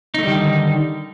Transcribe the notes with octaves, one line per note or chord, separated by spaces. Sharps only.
D3 D#3 G3 A3 D#4